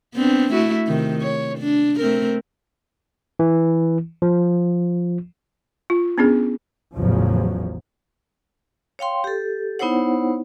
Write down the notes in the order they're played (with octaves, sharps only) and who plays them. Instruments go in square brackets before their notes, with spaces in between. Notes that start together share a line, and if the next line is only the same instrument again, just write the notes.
[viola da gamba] B3 C4 D4
A3 E4 F#4
C3 D#3
C#5
D4
A3 C4 A#4
[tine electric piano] E3
F3
[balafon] F4
B3 C#4 D4 G#4
[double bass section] A1 E2 C#3 F3 F#3
[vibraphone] C#5 F5 G5 C6
G4 A4
B3 D#4 E4 C5 C#5 F#5